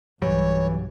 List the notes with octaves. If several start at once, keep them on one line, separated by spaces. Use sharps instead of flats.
B1 G2 E3 F#3 G3 C#5